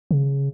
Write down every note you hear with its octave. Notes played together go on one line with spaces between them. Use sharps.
C#3